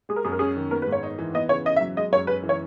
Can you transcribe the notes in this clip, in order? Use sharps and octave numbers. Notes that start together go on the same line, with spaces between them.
G#3 G#4
A#4
F#2 G#4
A#4
C#4 G#4
D#3
B3 A#4
B4
G#2
C#5
D#4
E3
B3 D#5
C#3 C#5
C#3 D#5
E5
F#3
G#3 D#5
F#2 C#5
C#4 B4
E3
C#5